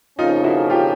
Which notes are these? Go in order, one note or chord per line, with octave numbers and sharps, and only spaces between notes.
F2 C#3 F3 A#3 C#4 D#4 F4
E4 F#4
F4 G4